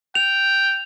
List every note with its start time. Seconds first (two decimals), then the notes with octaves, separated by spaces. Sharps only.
0.15 G5 F7